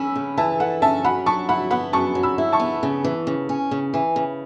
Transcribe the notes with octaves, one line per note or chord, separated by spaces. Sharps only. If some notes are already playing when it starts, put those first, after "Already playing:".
Already playing: C#4 B5 E6
C#3
E3 E5 A5
A4 F#5
C#4 E5 A5
F#2 F#5 B5
F#3 A5 C#6
E4 F#5 B5
B3 F#5 B5
F#2 A5 C#6
F#3
B5 E6
E4
A5 C#6
B3
C#3
E3
C#3
C#4
C#3
E3
C#3